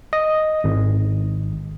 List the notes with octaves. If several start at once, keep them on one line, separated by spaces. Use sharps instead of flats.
D#5
G#1